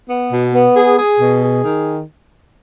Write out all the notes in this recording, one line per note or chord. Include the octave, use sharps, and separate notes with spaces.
B3
B2
B3
G#4
G#4
B2
G#4
D#3